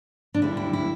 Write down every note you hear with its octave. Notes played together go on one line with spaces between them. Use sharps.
D4
D2 D3 G3 E4
E4
E4